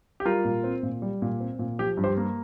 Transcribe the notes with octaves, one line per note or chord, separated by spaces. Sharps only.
G4
G3 F4 A#4
A#2
C4
A#2
G3
A#2
C4
A#2
F3 G4
G2
G4 C5
A#3